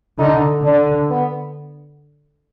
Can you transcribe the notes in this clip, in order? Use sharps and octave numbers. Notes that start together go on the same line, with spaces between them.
D3 D#4
D3 D4
B3